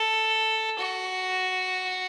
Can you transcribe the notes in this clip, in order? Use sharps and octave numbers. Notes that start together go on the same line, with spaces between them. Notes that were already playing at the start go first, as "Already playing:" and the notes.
Already playing: A4
F#4